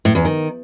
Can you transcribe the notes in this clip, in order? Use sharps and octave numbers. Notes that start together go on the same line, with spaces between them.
A2
E2
D#3